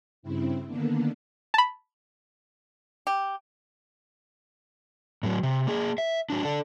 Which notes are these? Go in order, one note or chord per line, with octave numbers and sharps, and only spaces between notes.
G2 C#3 C4 E4
D3 D#3 A#3 B3 D4
A5 B5
G4
A2 F#3
C3
A#3 G#4
E5
F#3 D4
D4 A4